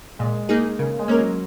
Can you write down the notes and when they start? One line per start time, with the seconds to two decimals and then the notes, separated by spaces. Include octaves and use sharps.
0.19 A#2 G#3
0.49 A#3 D#4 G#4
0.79 C#3 A#3
0.99 G#3
1.08 A#3 C#4 A#4
1.18 F#3